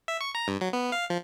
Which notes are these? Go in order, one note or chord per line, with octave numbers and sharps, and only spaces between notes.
E5
C#6
A#5
G2
F#3
B3
F5
F3